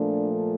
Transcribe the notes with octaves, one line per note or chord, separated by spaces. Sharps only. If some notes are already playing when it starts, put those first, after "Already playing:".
Already playing: A#2 F3 A3 D4